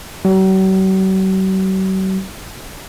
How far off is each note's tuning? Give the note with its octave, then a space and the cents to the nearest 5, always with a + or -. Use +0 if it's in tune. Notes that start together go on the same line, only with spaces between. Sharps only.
F#3 +45